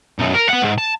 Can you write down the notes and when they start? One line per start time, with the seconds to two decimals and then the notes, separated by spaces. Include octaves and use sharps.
0.19 B1 F#2
0.35 A#4
0.50 B3 F#5
0.63 G#2
0.78 A5